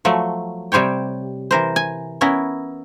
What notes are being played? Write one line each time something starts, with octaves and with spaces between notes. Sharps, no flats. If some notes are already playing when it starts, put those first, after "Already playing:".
F3 F#3 A3
C3 G3 C5 C#5 G5
E3 A#4 C5
G#5
B3 C#4 E4 A#4